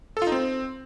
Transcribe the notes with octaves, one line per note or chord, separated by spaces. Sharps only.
A4
F4
D#4
C4